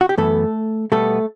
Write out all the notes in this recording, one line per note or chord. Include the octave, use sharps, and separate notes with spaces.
F#4
G4
F#2 E3 A3 B3 A4
B2 G3 A3 B3 A4